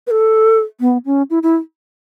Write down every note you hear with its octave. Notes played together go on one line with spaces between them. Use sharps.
B4
A4
B3
C#4
E4
E4